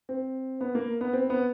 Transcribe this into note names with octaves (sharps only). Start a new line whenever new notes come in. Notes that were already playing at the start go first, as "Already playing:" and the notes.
C4
B3
A#3
B3
C4
B3